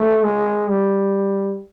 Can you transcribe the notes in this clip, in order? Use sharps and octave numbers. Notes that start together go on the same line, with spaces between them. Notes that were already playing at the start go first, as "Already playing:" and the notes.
Already playing: A3
G#3
G3